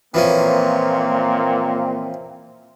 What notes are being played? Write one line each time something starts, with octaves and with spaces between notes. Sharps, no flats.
A#2 E3 F3 A#3 C4 C#4